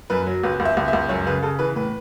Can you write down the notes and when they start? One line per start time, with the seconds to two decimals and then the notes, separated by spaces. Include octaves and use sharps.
0.10 F#2 B4
0.27 F#3
0.44 C#2 B4
0.60 C#2
0.65 E5
0.77 C#2
0.88 E5
0.93 C#2
1.09 F#2 C#5
1.26 C#3 B4
1.43 C#3 A4
1.59 E3 B4
1.75 A2 B4